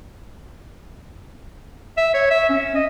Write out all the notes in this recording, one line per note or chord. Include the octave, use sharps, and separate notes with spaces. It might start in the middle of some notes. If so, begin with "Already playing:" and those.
E5
C#5
E5
C#4
D#5